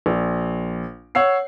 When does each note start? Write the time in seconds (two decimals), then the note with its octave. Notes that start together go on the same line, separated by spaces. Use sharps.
0.06 A#1
1.15 C#5 F#5 E6 C7